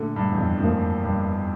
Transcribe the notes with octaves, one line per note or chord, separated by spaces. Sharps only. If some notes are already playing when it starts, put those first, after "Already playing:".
Already playing: A#1 A#2 D3 A3
G2
E2
F2
F2 A2 F3 A#3
G2